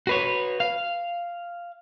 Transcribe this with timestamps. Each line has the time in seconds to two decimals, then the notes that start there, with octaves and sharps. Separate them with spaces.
0.07 F#4 B4 C#5
0.60 F5